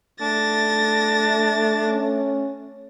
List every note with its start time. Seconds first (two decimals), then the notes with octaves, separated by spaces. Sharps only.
0.21 A3 D4 A6 A#6
1.89 C#4